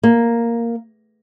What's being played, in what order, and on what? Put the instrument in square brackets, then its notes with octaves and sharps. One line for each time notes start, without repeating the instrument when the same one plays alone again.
[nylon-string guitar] A#3